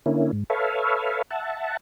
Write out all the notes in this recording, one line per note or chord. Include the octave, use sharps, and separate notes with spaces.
D3 A#3 C#4 E4
G#2
A4 B4 C#5 E5 F5
E5 F#5 A5